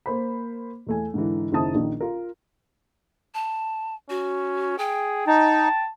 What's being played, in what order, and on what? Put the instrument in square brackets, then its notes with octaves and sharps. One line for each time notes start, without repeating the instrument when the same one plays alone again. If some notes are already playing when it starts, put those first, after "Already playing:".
[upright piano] A#3 C5 B5
E2 A3 G#5
G#2 D3 E3
F#1 D#3 E4 C5 A5 D#6
A#1 D#3
F4 A#4
[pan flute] A5
[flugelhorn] C#4 [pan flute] F#4
[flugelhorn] G#4 [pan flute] G5
[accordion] D#4 [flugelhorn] A5